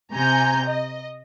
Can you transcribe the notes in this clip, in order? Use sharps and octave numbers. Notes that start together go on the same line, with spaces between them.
C3 G#5 A#5 G6
D#5